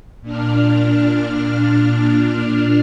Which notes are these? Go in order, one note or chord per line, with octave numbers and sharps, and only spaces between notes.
A#2 D4 F6